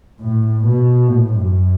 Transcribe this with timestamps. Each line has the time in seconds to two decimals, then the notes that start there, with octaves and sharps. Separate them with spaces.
0.21 A2
0.64 B2
1.08 A2
1.37 F#2